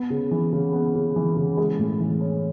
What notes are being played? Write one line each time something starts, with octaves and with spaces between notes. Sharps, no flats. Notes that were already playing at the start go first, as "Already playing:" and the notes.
Already playing: B3
C#3
E3
C#3
B3
C#3
E3
C#3
G#3
A2
E3
C#4